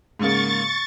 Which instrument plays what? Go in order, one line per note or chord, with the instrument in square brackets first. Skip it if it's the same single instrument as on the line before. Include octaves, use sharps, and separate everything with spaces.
[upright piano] G#2 C#3 A#3 [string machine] C#6 A6